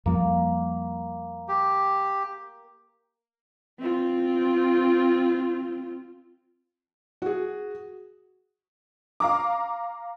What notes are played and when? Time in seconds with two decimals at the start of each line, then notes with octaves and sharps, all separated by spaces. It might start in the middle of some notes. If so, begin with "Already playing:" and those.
0.06 F2 F3 G3 A#3
1.48 G4
3.79 C4 F4
7.22 F#4 G#4
9.20 F5 A#5 D6